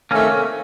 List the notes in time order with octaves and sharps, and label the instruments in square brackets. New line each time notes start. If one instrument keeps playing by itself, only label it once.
[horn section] C3 D#3 A3 C4 [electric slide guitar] A#3 C#4